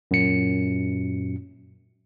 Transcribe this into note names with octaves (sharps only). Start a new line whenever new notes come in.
F#2 A#2 C#7